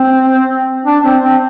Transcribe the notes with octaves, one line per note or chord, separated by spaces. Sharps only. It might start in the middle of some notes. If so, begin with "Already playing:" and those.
Already playing: C4
D4
C4
C4